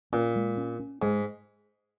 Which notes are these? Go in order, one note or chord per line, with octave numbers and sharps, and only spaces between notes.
A#2 C#4
G#3
C#4
C#4
G#2 G#3